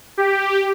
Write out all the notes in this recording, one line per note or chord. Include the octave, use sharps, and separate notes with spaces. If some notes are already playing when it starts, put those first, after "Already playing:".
G4